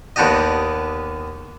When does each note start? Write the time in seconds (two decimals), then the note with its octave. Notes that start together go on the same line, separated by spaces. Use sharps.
0.16 D#2 B3 D4 G4 D#5